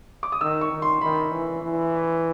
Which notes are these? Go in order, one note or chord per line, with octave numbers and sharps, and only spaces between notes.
D6
D#6
D#3 E6
C#6
D#3
C6
D#3 B5
E3
E3